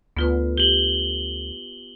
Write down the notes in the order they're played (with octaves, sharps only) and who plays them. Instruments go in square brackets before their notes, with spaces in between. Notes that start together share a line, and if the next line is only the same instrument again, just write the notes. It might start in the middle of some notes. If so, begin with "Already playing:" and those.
[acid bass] D2 [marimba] B3 F4 B4
[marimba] G4 [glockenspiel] F#7 G7